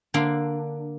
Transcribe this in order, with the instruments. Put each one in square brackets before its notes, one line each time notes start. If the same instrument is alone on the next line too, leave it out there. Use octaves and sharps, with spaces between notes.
[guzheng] D3 A#3 D4 C6